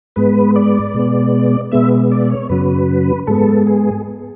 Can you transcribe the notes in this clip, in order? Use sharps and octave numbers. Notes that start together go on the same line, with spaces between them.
G#2 G#3 B3 B4
D5
B2 G#3 B3
B2 G#3 B3 E5
D5
C#5
F#2 C#3 F#3 B4
G#2 G#3 B3 A4
G#4